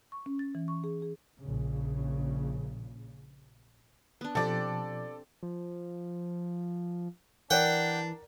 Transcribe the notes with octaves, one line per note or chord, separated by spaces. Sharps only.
C#6
C#4
A6
E3
C#6
G#4
G#4
A#1 C#3
B3 D4
B2 F3 C4 G4 A4 D5
F3
E3 D4 A#4 D5 F#5 G5